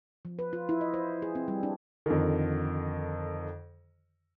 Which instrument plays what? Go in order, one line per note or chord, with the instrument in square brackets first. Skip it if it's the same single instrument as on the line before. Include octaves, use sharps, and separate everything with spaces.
[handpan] F3
B4
F4
E4
D#5
C5
G#4
C4
G3
D4
[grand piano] F2 D3 D#3